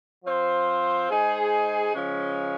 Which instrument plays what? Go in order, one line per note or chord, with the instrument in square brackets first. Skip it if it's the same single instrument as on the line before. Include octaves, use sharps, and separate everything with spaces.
[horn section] F3 C4 F4 C5
G#3 D#4 G#4 C5
C#3 F3 G#3 C#4